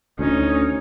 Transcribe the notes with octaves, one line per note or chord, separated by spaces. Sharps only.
D2 C#4 D#4